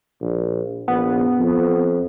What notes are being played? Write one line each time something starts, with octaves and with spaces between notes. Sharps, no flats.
A#1
A#1 B3
F2